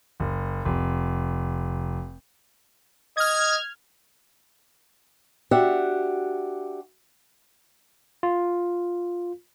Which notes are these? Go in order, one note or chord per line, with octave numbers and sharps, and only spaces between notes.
F#1
F1
D#5 F6 G#6
D4 F#4 G4 E5 F#5
F4